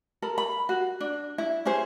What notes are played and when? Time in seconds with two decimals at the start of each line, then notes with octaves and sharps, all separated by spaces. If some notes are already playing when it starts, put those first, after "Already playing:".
0.22 A4 A#4 B5
0.38 B5
0.69 F#4
1.00 D4
1.38 E4
1.65 C#4 E4 G#4 C5